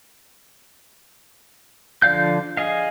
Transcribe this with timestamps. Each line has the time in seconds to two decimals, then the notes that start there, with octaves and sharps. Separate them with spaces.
2.02 D3 F3 D5 F5 G6
2.57 G#4 D#5 F5